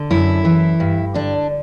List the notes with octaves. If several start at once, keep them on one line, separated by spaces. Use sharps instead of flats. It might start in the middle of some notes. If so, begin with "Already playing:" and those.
Already playing: D3
F#2 E4
E3
G2
D3 D4